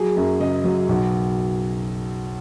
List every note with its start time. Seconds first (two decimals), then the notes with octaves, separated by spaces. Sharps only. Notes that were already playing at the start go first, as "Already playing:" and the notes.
Already playing: F#3 G#4
0.16 F#2
0.40 C#3 D#5
0.64 F#3
0.89 B1